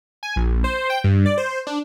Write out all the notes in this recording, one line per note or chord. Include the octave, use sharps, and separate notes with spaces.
G#5
A#1
C5
G5
G2
D5
C5
D4